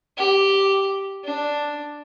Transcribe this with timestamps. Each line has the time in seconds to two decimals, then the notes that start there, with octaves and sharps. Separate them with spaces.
0.18 G4
1.25 D4